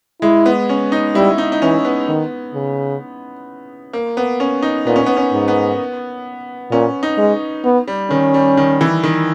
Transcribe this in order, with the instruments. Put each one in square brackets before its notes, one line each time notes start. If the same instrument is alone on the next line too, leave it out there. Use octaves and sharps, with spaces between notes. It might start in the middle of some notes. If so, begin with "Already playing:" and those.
[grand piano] G#3 [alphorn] E4
[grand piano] B3
C#4
D#4
[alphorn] G3 [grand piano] E4
[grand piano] D#4
D#4
[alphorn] E3 [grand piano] C#4
[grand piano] B3
[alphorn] D#3
C#3
[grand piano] A#3
B3
C#4
D#4
[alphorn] A#2 [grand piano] B3
[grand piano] C#4
B3
C#4
[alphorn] G#2
[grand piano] B3
[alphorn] A#2 [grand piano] C#4
[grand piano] D#4
[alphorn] G#3
B3
[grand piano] G3
[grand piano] D#3 [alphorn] C#4
[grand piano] G3
D#3
E3
D#3